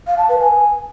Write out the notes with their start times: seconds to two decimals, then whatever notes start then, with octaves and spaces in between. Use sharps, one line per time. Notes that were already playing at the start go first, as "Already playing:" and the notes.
0.07 F5
0.18 A5
0.29 B4
0.40 G#5